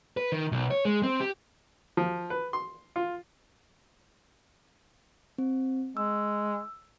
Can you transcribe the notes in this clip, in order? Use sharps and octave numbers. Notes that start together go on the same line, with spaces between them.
B4
D#3
B1
C#5
G#3
C4
G4
F3
B4
C6
F4
C4
G#3 E6